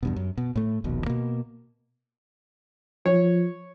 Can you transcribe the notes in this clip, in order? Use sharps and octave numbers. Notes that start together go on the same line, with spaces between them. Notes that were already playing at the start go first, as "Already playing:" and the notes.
E2 G2 B2
F#2
B2
A2 A3
D#1 A#1 D#2 B2
B2 A#3
F3 C#5